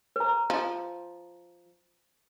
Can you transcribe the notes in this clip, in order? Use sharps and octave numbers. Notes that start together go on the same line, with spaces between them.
B4 A#5
F3